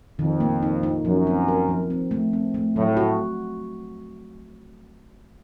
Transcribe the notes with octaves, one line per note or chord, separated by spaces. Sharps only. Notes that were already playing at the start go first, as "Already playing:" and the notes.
F2 D#3
A#3
D#4
D#4
F#2 F3
C4
A#4
F3
C4
A3
C4
A3
A2 F#3
F#4